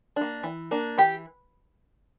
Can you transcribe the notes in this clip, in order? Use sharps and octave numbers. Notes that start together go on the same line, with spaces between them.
A#3 D4
E3
A#3 D4
E3 G4